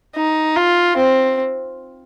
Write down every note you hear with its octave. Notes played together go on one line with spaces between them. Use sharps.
D#4
F4
C4